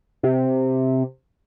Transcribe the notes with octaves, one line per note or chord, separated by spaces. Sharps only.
C3